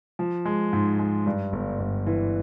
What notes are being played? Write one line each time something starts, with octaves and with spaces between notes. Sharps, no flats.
F3
G#3
G#2
G#3
G2
G1
G1
E3